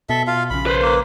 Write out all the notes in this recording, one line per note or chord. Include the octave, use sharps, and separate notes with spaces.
B2 A4 E5
F4 F5
A#1 C#3 B5
B4 C5
A#3